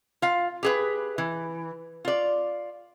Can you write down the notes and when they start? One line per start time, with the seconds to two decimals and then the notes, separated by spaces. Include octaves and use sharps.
0.22 F4 F5
0.63 G4 G#4 B4
1.18 E3
2.05 F4 D5